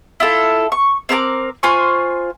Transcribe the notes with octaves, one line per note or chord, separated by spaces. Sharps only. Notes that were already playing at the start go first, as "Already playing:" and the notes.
E4 F4 A4
C#6
C4 A#4 A5 D6
F4 C5 G#5 C#6